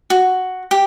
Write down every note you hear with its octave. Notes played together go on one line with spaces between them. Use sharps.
F#4
G4